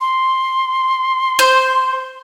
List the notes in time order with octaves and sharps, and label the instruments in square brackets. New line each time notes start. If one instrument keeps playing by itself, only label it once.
[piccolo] C6
[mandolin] C5